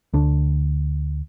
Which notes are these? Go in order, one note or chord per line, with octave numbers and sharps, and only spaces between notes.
D2 D4